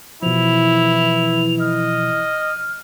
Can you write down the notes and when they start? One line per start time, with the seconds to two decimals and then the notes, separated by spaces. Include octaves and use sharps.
0.23 B2 E3 F3 E4 F7
1.60 D#5 F6